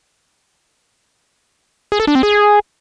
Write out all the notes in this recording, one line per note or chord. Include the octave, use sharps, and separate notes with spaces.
G#4
A4
D4
C4
G#4